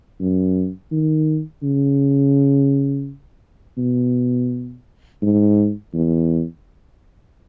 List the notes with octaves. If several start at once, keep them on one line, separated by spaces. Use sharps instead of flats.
F#2
D#3
C#3
B2
G#2
E2